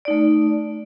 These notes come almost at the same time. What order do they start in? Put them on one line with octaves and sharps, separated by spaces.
D5 D#4 A3